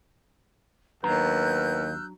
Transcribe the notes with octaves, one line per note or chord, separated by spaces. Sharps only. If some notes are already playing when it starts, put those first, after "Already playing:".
D#2 F#3 B3 D4 A#5 E6 F#6 G6